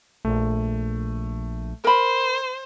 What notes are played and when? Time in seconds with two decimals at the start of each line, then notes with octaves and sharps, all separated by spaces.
0.25 A#1 A3
1.84 A#4 C5 B5